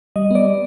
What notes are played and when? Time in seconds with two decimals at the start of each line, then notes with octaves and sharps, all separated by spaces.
0.16 G3 D#5
0.31 B3 D5